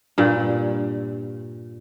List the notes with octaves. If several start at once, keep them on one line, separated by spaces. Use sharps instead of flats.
G2 A#2